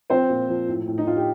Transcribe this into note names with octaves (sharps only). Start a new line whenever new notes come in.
F3 C4 C5
A#2
F3
A2
A2
D#4
A2 F4
G4